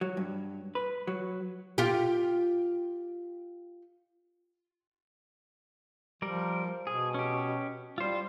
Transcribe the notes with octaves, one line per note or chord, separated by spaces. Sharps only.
F#3
G2
B4
F#3
F4 G4
F3 G3 A#4
B2 G#4
C#4 G4
G3 F4 C5